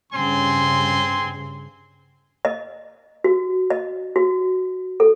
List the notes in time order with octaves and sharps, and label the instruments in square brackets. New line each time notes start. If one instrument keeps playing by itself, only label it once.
[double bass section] G2 C#3 [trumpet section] C4 G#5 C6
[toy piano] D#5
F#4
D#5
F#4
A4